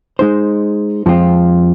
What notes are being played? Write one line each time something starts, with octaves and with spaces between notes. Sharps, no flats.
G#3 D#4 C5
F2 F3 G#3 C4 F4